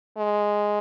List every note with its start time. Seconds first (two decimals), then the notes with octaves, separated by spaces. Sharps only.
0.18 G#3